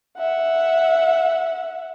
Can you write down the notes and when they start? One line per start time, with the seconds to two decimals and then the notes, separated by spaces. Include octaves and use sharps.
0.18 E5 F#5